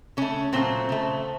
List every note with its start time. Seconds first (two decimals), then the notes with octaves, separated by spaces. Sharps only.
0.17 C#3 A3 C#4
0.53 A#2 F#3 A3 C4
0.89 C#3 A3